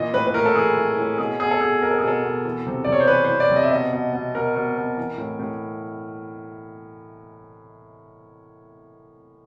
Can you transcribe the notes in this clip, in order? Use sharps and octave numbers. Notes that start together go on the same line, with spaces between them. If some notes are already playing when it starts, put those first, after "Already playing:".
Already playing: A#2 E3 D#5
A2 B4
B4
A2 A#4
A4
E3 G#4
E3
A2
B2 G#4
B2 G#4
A4
B2 G#4
B2 A#4
A4
G#4
B2 A4
B2
E3
C3
D5
C3
C#5
C5
E3 B4
E3 C5
D5
C3
D#5
E5
B2 D#5
B2
B2
B2 A#4
B2
B2
E3
A2
A2